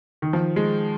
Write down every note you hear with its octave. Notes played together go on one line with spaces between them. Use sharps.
D#3
F3
G#3